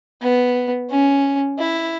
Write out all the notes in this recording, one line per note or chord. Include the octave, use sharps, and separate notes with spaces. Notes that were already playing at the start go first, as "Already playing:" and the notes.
B3
C#4
E4